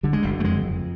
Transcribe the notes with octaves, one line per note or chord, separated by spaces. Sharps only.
D3 G3
G#3
F#1 G3
A3
F2 G#3
F2